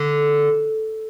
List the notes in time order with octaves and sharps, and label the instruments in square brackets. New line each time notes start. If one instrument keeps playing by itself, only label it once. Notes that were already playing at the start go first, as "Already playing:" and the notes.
Already playing: [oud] D3